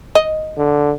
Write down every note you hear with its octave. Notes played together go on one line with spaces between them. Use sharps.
D#5
D3